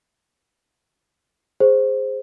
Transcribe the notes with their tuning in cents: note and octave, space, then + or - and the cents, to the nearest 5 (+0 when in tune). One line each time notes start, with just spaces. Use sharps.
G#4 -10 C5 +0